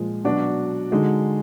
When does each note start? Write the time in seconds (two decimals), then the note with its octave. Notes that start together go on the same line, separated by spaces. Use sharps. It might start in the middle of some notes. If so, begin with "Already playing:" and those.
Already playing: A#2 F3 G#3
0.24 B2 F#3 D4 F#4
0.91 D3 G#3 D#4 F#4